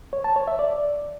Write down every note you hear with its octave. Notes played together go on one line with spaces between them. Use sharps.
C#5
A5
C#5
E5
D5